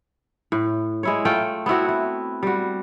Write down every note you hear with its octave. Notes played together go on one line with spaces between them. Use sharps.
A2
G#3 E4 C#5
A3 F4 G5
B3 C4 E4 F#4
E4
G3 F#4